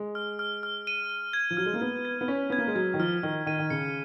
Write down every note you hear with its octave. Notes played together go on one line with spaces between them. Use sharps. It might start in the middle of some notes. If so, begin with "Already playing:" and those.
Already playing: G#3
F6
F6
F6
D#7
D#7
G#6
F3
F#3 F6
G#3
A#3
B3 G#6
G#6
B3
C#4 B6
B3 G#6
A#3
G#3
F#3 G#6
D#3
F3 F6
D#3 F6
D#3 D#7
D#3
C#3 C#7